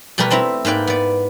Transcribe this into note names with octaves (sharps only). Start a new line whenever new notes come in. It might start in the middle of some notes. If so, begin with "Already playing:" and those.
B2 G3 A3 G4 A#4 B4
A3 C4 E4 E5 A#5
G#2 A#3 B4 D5 G5
B3 D5